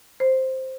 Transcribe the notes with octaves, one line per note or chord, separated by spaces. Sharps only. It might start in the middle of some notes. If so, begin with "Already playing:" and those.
C5